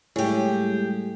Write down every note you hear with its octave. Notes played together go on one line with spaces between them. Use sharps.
A2 G3 G#3 G4 G#4